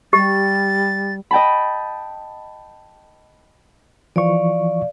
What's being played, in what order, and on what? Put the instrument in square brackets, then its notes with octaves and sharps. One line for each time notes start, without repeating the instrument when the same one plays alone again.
[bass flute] G3 [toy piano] G4 [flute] A6
[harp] D#5 G5 A5 B5
[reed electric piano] E3 F3 C#6 [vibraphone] D5 F5